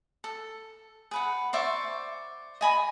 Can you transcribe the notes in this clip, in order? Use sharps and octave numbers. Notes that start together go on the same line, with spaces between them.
A4
G#4 B4 F#5
C5 D5 E5 C#6
D#5 G#5 B5